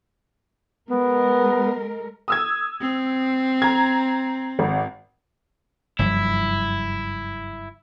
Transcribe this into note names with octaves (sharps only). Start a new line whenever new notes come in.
G#3 B3 A#4
D#6 E6 G#6
C4
A#5 G#6
G#1
F#1 G2 F3 E4